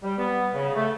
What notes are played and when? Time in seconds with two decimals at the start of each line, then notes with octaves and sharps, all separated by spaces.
0.03 G3
0.18 B3
0.54 C#3
0.75 A3